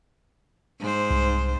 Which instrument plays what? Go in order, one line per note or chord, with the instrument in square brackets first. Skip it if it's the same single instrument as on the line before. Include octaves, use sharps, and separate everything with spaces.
[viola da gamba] G#2 C5
[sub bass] C2